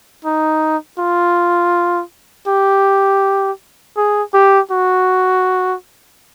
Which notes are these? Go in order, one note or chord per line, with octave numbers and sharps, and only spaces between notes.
D#4
F4
G4
G#4
G4
F#4